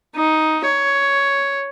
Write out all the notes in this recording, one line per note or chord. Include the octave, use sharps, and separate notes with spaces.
D#4
C#5